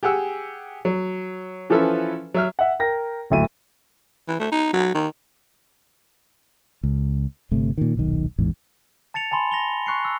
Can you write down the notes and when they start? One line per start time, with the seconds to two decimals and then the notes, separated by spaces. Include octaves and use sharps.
0.03 G4 G#4 F#5 E6
0.85 F#3
1.70 E3 F3 C#4 A4 B4 E5
2.34 F#3 E5 F6
2.59 E5 F#5
2.80 A#4 G5 A#6
3.30 D1 G#1 D2 E5 D#7
4.28 E3
4.40 A3
4.52 D#4
4.73 F#3
4.95 D#3
6.83 C#2
7.51 G1 C3 A3 C4
7.78 A#2 D#3
7.95 D#1 B1 D#3
8.39 A1 E2 G#2
9.14 A5 A6 C#7 F7
9.31 G#5 A5 B5 C6
9.51 A#6 F7 G7
9.86 C6 C#6 F#6 C7 C#7
10.05 E6